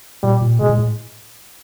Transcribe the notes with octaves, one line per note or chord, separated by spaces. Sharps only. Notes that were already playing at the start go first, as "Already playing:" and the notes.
A#2 G3
A#2
B2 G#3
A#2
A2